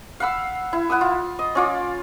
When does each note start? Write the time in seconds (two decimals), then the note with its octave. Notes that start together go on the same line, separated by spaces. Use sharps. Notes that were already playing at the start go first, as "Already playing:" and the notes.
0.20 F5 F#5 B5 E6
0.73 E4
0.90 E4 F#5 B5 D#6
1.01 F4
1.39 D#5
1.55 C#4 F4 D5